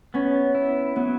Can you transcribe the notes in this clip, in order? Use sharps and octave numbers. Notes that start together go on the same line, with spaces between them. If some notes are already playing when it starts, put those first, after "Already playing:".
B3 C#4
E4
F#3 B3